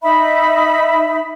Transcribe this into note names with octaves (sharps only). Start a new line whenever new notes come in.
D#4 E5 B5